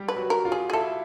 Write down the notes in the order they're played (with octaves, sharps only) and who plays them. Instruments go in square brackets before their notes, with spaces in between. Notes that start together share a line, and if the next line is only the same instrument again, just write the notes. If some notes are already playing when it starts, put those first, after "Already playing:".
Already playing: [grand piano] G3 G4
[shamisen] B4
[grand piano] F#3 F#4
[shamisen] A#4
[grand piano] F4
[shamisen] G#4
G#4
[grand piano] E4 [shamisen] A4